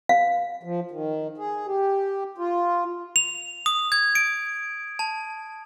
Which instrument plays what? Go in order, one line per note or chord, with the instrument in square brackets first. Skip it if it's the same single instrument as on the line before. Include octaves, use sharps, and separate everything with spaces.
[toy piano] F5
[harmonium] F3
D#3
G#4
G4
F4
[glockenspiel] F7
D#6
G#6
D7
A5